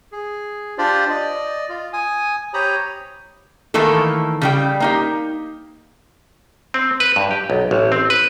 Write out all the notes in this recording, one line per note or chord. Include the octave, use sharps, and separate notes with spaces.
G#4
D4 F4 G4 C5 D5
D5 D#5
F4
G#5 D#6
G4 C5 C#5 A#5 B5 D#6
D#3 E3 A3 A#3 A4
C#3 G3 G5
A#3 D#4 G4
C4
B4
G2
G4
B1
A1
C4
B4